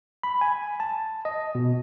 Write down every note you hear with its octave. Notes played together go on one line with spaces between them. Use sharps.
B5
G#5
A5
D#5
B2